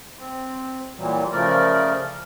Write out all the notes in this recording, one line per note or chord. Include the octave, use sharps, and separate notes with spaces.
C4
A#2 E3 F#3 G3
C#3 F3 A3 A#4 D5